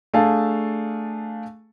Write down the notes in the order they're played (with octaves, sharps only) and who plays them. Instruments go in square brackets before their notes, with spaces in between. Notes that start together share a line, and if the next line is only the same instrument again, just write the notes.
[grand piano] A3 D4 G#4 F5 A5